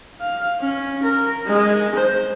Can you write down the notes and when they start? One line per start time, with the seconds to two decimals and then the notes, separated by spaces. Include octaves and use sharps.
0.20 F5
0.60 C#4
1.03 A#4
1.46 G#3
1.95 C5